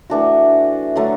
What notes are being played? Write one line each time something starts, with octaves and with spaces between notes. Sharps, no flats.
E3 A3 D4 F#4
D3 F#3 A3